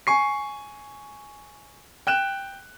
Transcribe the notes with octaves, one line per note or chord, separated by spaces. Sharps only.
G#5 C#6 C7
G5 F#6 E7